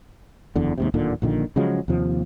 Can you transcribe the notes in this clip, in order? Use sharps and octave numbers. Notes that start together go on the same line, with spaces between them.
F#1 E2 D3
D#2 G#2 C3
D1 D#2 A#2 D3
A#1 A#2 D3 D#3
C#3 F3 F#3 G#3
D#2 C3 F3